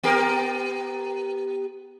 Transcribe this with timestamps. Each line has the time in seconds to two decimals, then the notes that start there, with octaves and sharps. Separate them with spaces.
0.03 B3 G4 A#4